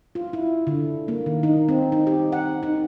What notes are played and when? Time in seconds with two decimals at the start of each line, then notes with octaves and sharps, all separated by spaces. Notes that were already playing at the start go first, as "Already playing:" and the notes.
0.15 F4
0.33 E4
0.67 D3
1.08 A#3
1.26 D#3
1.43 D#4
1.69 C4
1.92 D#4
2.07 G4
2.32 F#5
2.63 D#4